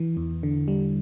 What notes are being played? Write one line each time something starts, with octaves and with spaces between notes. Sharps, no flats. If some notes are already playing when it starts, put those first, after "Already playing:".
Already playing: E3
E2
D3
G3